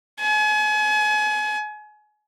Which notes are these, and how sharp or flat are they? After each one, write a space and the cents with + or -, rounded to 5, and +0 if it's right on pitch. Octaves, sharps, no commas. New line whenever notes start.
G#5 +35